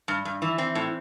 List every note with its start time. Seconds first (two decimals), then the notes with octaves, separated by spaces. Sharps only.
0.08 G2
0.25 G2
0.42 E3
0.58 E3 C4
0.75 A2